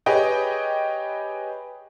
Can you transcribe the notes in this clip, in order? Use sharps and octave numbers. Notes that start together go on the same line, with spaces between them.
G4 G#4 B4 C#5 D#5 G5